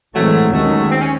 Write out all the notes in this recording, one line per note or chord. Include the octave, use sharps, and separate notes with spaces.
A2 E3 F#3 G#3 A3 C4
D#2 D#3 F#3 G#3 A3 C#4
C4
C#4